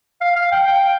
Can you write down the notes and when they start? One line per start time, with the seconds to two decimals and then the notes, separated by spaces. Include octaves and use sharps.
0.21 F5
0.36 F5
0.52 G5
0.67 G5